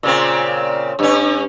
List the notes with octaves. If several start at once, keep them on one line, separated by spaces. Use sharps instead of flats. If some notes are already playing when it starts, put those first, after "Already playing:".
A#2 C#3 C4
G2 C#4